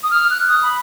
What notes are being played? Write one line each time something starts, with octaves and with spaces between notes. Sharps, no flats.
D#6
F6
F#6
D#6
B5